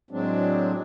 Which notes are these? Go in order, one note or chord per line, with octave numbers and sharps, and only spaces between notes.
A2 F#3 G#3 C4 D4